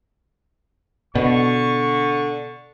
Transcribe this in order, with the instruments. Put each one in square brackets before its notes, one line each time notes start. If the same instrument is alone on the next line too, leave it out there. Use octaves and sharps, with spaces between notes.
[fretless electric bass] B2 [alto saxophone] D3 [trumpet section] C#6